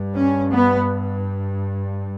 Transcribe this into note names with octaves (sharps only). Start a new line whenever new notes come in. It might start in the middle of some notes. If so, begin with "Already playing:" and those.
Already playing: G2
C#4
B3